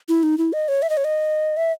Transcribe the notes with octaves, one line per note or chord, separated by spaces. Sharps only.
E4
D#4
E4
D#5
C#5
E5
D#5
C#5
D#5
E5